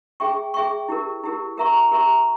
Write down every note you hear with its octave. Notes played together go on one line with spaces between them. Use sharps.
G#4 E5 G5 C#6
G#4 E5 G5 C#6
E4 G4 A#4
E4 G4 A#4
G4 A#4 E5 A#5 C#6
G4 A#4 E5 A#5 C#6